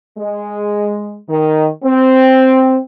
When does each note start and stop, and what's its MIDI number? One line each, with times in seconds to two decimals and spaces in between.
0.18 1.19 56
1.29 1.67 51
1.84 2.77 60